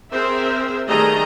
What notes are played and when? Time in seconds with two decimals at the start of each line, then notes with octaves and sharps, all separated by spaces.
0.12 C4 G#4 A#4 C5 E5
0.87 D#3 G3 A3 G#4 D#5 A#5